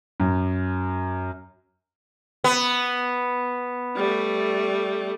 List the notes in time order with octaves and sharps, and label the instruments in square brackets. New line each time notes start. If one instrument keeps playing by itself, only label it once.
[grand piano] F#2
[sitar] B3
[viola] G3 A3